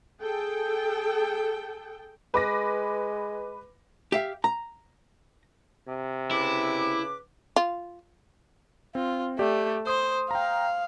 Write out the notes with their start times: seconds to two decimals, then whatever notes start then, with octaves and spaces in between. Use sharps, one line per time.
0.21 G#4 A4 G5
2.34 G#3 B4 D6 A#6
4.12 G4 E5 F5
4.44 A#5
5.88 C3
6.31 C#3 E4 B4 D6
7.56 F4
8.95 C4 F4
9.39 A3 G4 D5
9.87 C5 D#6
10.31 F5 G5 A#5